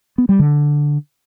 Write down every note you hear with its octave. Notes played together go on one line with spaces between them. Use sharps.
B3
G3
D3